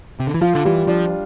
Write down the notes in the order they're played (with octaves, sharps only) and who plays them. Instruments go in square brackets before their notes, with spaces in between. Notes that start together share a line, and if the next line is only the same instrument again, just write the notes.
[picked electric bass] C3
D3
E3
[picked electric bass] F3 [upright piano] F4
[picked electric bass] D3
[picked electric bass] E3 [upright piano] G3
[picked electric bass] F3 [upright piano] D4